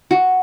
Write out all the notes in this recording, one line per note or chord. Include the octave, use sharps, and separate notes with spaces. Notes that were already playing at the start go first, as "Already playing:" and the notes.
F#4